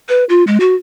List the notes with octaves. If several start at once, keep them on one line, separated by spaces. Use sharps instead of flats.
B4
F4
G#3
F#4